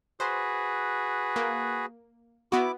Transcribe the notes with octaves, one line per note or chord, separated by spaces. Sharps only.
F#4 G#4 B4 C5
A#3
B3 E4 F#4 D6